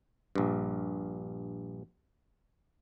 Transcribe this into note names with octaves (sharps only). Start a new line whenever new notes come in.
A#1 G2